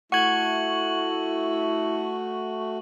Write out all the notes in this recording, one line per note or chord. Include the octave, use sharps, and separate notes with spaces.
A3 E4 F#4 F#5 C#6 G#6 F#7